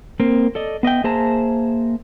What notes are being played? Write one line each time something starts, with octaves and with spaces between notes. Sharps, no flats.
A#3 C4
A4 D5 D#5
B3 D#5 E5 G5
A#3 G#4 C5 E5 A5 A#5